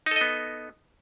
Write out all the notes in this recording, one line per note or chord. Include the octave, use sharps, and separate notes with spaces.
B3 D#4 A4 D#5